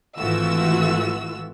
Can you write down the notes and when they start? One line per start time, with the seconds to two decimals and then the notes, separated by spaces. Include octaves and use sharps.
0.18 G#1 E3 A3 F4 F#4 E6